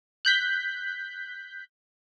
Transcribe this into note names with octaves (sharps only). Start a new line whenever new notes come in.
F#6 G6 B6